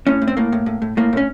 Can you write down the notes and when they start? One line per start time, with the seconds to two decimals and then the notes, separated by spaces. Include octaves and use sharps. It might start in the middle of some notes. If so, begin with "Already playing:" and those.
0.07 A2 C#4
0.22 A2
0.28 C4
0.37 A2 A#3
0.52 A2
0.66 A2
0.82 A2
0.97 A2 A#3
1.13 A2 C#4